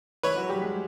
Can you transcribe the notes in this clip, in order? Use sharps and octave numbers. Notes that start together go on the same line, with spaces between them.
E3 E4 B4 C#5
F#3 F#4
G3 G4
G#3 G#4